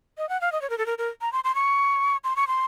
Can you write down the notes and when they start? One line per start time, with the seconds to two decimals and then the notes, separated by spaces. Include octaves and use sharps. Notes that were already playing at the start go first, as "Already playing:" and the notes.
0.18 D#5
0.29 F#5
0.41 F5
0.52 D#5
0.62 C#5
0.70 A#4
0.78 A4
0.86 A#4
0.98 A#4
1.21 A#5
1.33 C6
1.44 C6
1.55 C#6
2.24 C6
2.36 C#6
2.48 C6